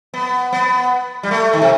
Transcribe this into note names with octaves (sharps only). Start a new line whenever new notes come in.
B3
B3
G3
A3
D#3
C3